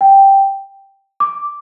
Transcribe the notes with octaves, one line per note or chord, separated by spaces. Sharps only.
G5
D6